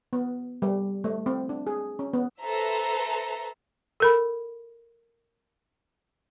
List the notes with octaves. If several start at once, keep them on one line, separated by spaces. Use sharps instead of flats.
B3
G3
A3
C4
D4
G#4
C#4
B3
A4 B4 C5 E5 A#5
A4 A#4 B5